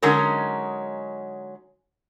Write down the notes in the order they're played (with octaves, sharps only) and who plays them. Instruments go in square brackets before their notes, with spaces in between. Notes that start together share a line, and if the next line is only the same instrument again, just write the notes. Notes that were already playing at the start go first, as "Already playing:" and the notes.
[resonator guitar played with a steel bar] D3 F#3 G#3 C#4 D#4 A#4